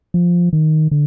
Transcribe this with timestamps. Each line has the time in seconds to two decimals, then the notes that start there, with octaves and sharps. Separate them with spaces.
0.14 F3
0.53 D#3
0.91 D3